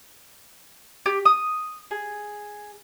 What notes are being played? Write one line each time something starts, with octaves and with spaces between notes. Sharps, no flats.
G4
D#6
G#4